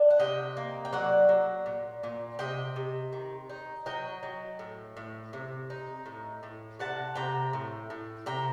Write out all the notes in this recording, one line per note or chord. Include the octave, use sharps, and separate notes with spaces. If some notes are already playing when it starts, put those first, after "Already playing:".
Already playing: D4
F#5
C3 D#5 G5
A#3
G5
F#3 D5 F#5
F#3
A#2
A#2
C3 D#5 G5
C3
D#3
D#4
F#3 D#5 G5
F#3
A2
A2
C3
D#4
A2
A2
C3 F#5 A5
C3 G5 A#5
A2
A2
C3 G5 A#5